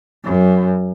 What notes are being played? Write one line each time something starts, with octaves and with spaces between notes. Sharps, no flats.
F#2